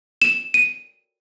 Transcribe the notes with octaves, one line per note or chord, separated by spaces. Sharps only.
E7
D#7